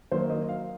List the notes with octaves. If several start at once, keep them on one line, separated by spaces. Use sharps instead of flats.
D#3 F#3 A#3 C5
D#5
F5